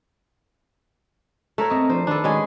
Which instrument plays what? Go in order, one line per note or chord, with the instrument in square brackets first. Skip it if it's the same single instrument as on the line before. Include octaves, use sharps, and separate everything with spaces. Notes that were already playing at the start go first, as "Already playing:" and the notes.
[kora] A3 A#4 C#5
[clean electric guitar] C4 D#5
[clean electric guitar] F3 D4 [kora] C5
[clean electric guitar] D#3 B4 [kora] D4 A4
[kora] G#3 C#4 G#4